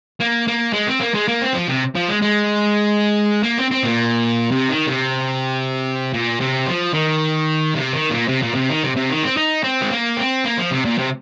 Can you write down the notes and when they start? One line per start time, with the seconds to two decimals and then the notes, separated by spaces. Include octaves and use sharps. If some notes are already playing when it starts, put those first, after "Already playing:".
0.20 A#3
0.48 A#3
0.73 G#3
0.88 C4
1.00 A#3
1.15 G#3
1.28 A#3
1.42 C4
1.54 F3
1.69 C3
1.95 F3
2.09 G#3
2.22 G#3
3.43 A#3
3.58 C4
3.71 C4
3.83 A#2
4.52 C3
4.69 D#3
4.87 C3
6.14 A#2
6.41 C3
6.67 F3
6.94 D#3
7.74 C3
7.93 D#3
8.10 A#2
8.29 C3
8.43 A#2
8.55 C3
8.70 D#3
8.84 C3
8.96 C3
9.10 D#3
9.24 C4
9.37 D#4
9.64 C4
9.82 G#3
9.91 A#3
10.17 C4
10.45 A#3
10.58 F3
10.71 C3
10.85 A#2
10.98 C3